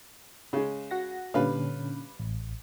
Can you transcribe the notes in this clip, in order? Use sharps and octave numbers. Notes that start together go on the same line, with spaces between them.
C#3 G#3
F#4 F#5 A#6
A#2 D3 G3 C#4 B4 F5
A1